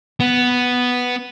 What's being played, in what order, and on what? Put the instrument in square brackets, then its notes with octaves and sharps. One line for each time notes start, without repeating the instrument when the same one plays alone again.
[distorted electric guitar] B3